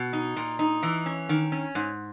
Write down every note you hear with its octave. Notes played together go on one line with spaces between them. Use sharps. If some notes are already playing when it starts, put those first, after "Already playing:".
Already playing: B2
D#4
A#2
D#4
E3
C#4
D#3
C#4
G#2